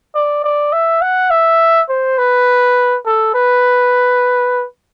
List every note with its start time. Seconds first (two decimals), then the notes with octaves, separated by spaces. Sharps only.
0.15 D5
0.44 D5
0.72 E5
1.02 F#5
1.30 E5
1.89 C5
2.18 B4
3.05 A4
3.34 B4